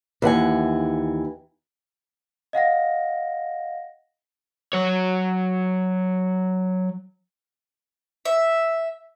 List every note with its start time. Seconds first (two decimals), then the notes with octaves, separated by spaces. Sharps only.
0.22 D#2 E3 F#5 G#5
2.53 D#5 F5 F#5 A#6
4.73 F#3 C#5
8.25 E5